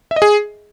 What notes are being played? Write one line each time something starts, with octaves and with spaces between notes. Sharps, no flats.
E5
D#5
G#4